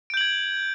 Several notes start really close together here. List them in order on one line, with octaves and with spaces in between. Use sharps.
D7 G6 F#7 G#6